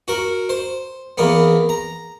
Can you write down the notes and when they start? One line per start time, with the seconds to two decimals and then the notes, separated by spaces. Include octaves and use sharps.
0.08 F#4 A#4
0.49 C5
1.18 E2 A#3 B3
1.69 A#5